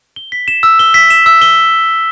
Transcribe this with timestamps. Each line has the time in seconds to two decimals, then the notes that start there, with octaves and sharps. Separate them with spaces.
0.16 G7
0.32 B6
0.48 E7
0.63 E6
0.79 G7
0.94 B6
1.10 E7
1.26 E6
1.42 G7